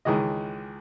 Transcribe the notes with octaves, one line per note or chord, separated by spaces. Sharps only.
C#2 D#3 E3 G#3 D#5